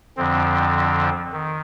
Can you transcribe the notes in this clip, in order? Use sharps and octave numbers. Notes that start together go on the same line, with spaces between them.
F2 D3 F3 C4
D#3